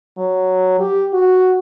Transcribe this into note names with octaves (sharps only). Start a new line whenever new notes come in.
F#3
G4
F#4